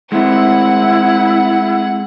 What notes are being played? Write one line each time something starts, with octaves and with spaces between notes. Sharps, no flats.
G#3 A3 C4 E4 F#5